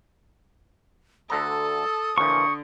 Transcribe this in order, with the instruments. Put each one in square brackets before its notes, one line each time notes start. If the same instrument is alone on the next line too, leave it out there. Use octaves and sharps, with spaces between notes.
[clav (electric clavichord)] D2 D3 A#5 [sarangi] A4 [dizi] D#6
[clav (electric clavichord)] A#2 E3 F3 [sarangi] D3 [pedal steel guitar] C#6